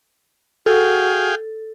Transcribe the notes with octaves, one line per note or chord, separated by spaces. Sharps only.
F#4 G#4 A4 F5 G5